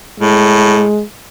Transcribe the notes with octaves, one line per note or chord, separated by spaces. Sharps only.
A2 G#3